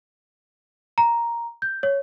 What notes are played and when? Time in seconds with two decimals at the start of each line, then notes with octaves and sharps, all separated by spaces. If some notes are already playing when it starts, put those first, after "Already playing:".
0.98 A#5
1.62 G6
1.83 C#5